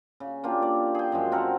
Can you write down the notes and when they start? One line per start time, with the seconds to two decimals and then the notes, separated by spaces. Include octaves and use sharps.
0.20 C#3
0.44 A#3 D4 F4 G4
0.62 D5
0.95 G#4 G5
1.12 F#2 F3 G#3
1.32 C4 A4 A#4 F#5